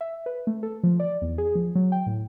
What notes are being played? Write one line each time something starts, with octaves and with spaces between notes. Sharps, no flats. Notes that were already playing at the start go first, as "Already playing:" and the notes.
E5
B4
A3
A4
F3
D5
E2
G#4
F3
F#3
G5
A2